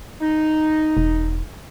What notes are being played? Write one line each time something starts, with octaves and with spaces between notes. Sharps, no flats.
D#4
E1